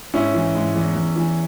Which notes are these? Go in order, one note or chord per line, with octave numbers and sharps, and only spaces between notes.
G#2 C#4 E4
E3
G#2
E2
E2
E3